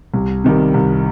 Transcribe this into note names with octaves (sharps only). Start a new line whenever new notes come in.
C2
C3 D#3 G3
C2